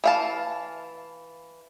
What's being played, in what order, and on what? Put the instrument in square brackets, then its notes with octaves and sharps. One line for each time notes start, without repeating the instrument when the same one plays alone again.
[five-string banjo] E3 F5 A5